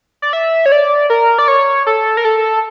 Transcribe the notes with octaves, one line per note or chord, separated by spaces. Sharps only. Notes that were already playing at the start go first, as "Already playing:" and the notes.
D5
E5
C#5
D5
A#4
D5
C#5
A4
A#4
A4